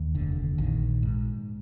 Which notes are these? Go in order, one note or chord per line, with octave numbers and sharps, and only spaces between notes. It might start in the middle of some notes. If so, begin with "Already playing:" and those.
Already playing: D#2
F1 D3
A#1 D#3
G#2